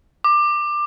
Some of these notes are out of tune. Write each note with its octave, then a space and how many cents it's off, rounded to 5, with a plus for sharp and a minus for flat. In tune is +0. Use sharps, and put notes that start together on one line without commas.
D6 +20